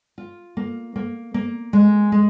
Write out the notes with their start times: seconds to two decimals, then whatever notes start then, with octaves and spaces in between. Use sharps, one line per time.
0.18 F4
0.57 A#3
0.96 A#3
1.34 A#3
1.73 G#3
2.12 G#3